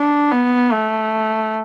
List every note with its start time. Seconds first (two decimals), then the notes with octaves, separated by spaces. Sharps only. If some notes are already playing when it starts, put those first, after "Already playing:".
Already playing: D4
0.31 B3
0.72 A3